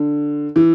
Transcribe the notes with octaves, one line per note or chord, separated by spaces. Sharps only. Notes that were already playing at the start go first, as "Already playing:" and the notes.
Already playing: D3
E3